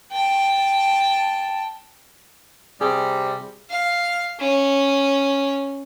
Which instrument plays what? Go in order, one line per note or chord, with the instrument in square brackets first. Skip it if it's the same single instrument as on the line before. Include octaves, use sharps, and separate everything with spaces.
[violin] G5 A5
[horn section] C3 G3 [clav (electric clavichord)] G#4
[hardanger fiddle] F5
C#4